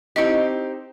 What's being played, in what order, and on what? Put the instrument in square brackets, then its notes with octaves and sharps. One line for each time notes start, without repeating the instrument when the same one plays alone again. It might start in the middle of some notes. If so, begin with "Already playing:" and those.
[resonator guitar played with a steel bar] C4 D#4 G4 [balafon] E4 D#5